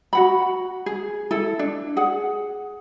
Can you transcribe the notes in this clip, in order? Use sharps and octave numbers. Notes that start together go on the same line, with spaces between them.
F#4 F#5 B5
G#4
E4 A4
D4
G#4 F#5